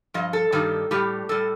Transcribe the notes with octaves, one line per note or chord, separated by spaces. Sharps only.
G2 F3 D#5
A4
G2 D#3 G3
A2 G3 G4
A2 G3 A4